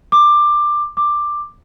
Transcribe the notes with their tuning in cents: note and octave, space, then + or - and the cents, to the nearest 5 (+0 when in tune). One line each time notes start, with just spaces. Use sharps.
D6 +15
D6 +10